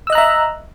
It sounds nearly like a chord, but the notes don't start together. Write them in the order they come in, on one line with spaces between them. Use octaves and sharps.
E6 D#5 F#6 A#5 E5